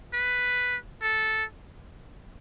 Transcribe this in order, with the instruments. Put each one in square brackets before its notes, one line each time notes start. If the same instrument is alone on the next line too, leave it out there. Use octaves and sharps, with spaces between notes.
[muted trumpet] B4
A4